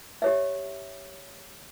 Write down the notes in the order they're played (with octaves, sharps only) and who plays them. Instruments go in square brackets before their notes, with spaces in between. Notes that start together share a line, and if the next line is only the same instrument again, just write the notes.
[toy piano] G4 C#5 E5